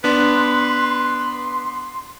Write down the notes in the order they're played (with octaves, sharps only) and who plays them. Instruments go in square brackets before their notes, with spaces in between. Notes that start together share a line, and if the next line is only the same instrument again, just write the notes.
[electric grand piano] B3 D4 [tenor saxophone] B4 [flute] C6